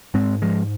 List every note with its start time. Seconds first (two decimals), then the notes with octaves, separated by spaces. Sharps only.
0.14 G#2 G#3 C4
0.42 F3 G#3